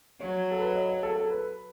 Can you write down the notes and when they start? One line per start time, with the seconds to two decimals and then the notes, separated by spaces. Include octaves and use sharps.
0.20 F#3 C#5
0.52 A4
0.60 B4
0.68 C#5
0.75 D#5
0.89 C#5
1.03 A4
1.16 A4
1.30 B4